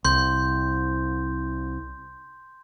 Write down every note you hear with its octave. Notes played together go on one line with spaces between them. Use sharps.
C2 C6 G6